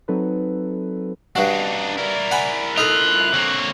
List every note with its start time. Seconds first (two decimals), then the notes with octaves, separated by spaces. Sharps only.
0.08 F#3 C4 D#4 A4 B4
1.36 G2 D4 D#4 F#4
1.97 E4 A#4 D5
2.31 F#5 G#5 B5
2.78 D#4 F4 A4 F#6
3.33 D3 A#3 C4 C#5